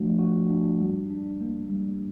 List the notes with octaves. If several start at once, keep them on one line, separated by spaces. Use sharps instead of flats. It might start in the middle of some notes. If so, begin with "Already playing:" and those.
Already playing: F3 A3 D4 F#4
F#4
D4
G3
D4
A#3
G3